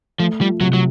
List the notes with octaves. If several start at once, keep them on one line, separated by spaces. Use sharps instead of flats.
F3 A3
F3 G3
C3 F#3
F#3